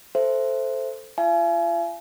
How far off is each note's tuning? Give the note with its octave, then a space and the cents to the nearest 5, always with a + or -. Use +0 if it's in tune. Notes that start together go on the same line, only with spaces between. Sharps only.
A4 +0 C5 +0 E5 +15
F4 -40 F5 -45 G#5 +30